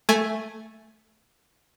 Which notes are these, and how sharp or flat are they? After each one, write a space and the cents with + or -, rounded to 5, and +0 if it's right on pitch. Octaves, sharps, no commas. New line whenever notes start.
A3 +0 G#5 +5